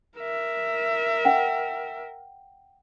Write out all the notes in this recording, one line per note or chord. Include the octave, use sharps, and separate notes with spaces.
A#4 E5
F#5 G5